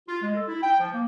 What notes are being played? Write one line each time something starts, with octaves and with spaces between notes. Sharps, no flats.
F4
G#3
A4
E4
G5
F3
A#3